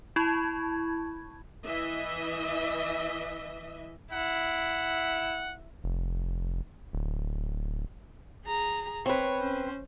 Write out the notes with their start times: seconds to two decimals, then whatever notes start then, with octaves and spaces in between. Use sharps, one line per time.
0.16 E4 A5 B5 C#6 G#6
1.64 E3 D#5 E5
4.13 E4 F#5
5.84 F1
6.93 D1
8.45 G#4 A#5
9.06 C4 B4 C#5
9.40 C#4 C5